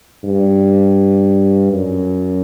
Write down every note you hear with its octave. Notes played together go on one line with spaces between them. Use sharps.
G2
F#2